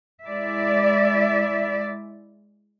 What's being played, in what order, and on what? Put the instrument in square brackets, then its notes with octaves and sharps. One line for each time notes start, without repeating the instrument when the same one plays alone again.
[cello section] G#3 E4 D5 E5